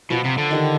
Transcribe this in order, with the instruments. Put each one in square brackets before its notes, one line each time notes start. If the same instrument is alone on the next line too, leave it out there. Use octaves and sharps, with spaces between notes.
[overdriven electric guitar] B2 [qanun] F3 B3 F4
[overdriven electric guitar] C3
D3
[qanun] D#3 G3 D4